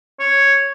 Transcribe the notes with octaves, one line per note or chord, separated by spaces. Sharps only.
C#5